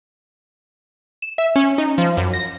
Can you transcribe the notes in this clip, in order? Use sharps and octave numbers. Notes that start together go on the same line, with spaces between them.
E7
E5
C#4
D#4
F3
F#2
A#6